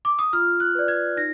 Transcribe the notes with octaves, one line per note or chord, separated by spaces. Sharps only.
D6
D#6
F4 F6
F#6
B4 D5
G#6
D#4 A#6